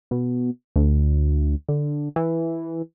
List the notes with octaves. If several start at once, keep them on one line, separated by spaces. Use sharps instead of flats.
B2
D2
D3
E3